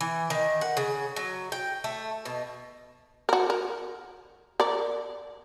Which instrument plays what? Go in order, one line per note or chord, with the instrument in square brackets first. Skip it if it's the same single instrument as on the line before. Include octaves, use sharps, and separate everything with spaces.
[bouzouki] E3
D#3
F#5
C#3
F#3
G5
A3
B2
[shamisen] F#4 A#4
A#4
A#4 D5